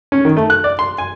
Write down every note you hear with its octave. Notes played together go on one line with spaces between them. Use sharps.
C#4
D#3
A3
F#6
D5
C6
G#5